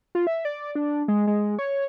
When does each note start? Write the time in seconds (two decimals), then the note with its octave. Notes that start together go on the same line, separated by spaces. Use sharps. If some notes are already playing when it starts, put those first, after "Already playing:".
0.15 F4
0.27 E5
0.45 D5
0.75 D4
1.08 G#3
1.27 G#3
1.59 C#5